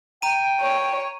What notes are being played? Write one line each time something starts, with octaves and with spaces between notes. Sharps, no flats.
G5 A#5 D#7
C#5